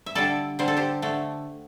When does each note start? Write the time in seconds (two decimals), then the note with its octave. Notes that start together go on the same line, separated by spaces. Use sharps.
0.06 E5
0.15 D3 G3 A4 D5
0.59 D3 G3 C5
0.68 A4
0.77 G4 C5
1.02 D3 A3